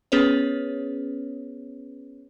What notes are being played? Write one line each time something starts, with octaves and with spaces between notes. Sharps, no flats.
B3 C#4 G#4 B4 C#5